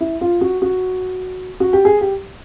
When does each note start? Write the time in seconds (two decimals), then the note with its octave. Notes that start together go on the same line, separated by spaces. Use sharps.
0.01 E4
0.21 F4
0.41 F#4
0.62 F#4
1.60 F#4
1.73 G4
1.85 G#4
2.01 G4